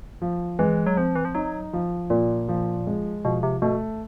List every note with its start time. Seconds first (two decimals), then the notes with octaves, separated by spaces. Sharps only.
0.22 F3
0.59 E3 G#3
0.86 F#3
0.97 F3 C4
1.15 E3
1.25 F3
1.35 F#3 D#4
1.73 F3
2.10 A#2 A#3
2.49 F3
2.87 G#3
3.25 B2 F3
3.43 C3
3.62 B2 A3